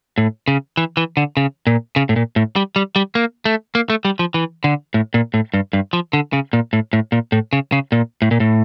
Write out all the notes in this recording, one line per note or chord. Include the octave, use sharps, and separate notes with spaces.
A2
C#3
E3
E3
D3
C#3
A#2
C#3
A2
A#2
A2
G3
G3
G3
A#3
A3
A#3
A3
G3
F3
E3
D3
A2
A#2
A2
G2
G2
F3
D3
C#3
A#2
A2
A2
A#2
A2
C#3
C#3
A#2
A2
A#2
A2